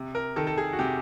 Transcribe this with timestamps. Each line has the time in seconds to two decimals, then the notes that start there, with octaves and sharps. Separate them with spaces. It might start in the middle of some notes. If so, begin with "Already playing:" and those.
Already playing: C3
0.15 A#4
0.36 D#3 A4
0.47 A4
0.57 G#4
0.73 F#4
0.79 C3 G4